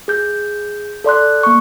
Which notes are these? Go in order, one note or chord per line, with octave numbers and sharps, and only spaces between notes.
G#4 G6
A4 D5 C6 F#6
A#3 C#6